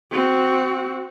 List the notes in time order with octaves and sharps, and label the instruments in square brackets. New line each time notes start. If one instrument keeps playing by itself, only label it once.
[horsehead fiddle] C4 F#4